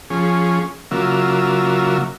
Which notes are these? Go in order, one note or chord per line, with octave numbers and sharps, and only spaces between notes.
F3 C#4 G#4
C#3 F#3 A#3 F4 E5